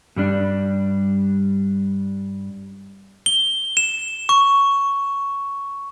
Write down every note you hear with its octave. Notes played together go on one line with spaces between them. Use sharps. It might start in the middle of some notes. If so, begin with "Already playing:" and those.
G2 G3 D4
G7
E7
C#6